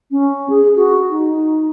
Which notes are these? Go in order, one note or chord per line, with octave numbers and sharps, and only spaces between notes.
C#4
G#4
F#4
D#4